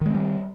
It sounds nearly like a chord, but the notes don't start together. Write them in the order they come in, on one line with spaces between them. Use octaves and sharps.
D#3 G#3 C4 G3